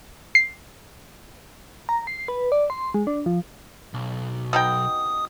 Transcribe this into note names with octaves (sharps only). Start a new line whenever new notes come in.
C7
A#5
C7
B4
D5
C6
G#3
D4
F3
B1
B2 D#4 G5 D#6